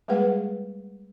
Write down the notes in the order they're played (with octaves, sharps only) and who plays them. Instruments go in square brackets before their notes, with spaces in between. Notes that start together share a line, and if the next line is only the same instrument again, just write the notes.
[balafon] G3 G#3 A#3 G#4 B4 F#5